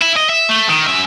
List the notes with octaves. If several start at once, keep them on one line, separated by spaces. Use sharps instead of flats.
E4
D#5
E5
A3
D#3
F#2 E5